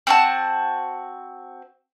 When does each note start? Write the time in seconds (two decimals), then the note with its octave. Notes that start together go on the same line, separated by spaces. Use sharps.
0.07 C4 F#4 A5